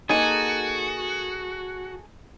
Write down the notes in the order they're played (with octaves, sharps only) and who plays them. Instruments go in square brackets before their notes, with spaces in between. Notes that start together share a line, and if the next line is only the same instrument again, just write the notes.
[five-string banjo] A#3 D#4 [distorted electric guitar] F#4 [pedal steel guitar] G#4 A4 G#5